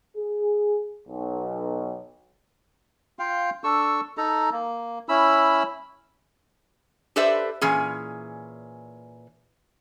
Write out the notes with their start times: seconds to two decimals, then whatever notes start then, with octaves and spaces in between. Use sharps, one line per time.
0.17 G#4
1.08 B1
3.19 F4 F5 G5
3.64 D4 A4 C#6 E6
4.17 D#4 A4 A#5
4.52 A#3
5.09 C#4 E4 B5 E6
7.16 G4 A4 B4 C5 D5 E5
7.61 A#2 E3 C#4 G#4